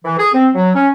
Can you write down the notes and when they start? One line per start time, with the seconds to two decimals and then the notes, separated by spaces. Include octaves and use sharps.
0.05 E3
0.18 G#4
0.34 C4
0.54 F#3
0.75 C#4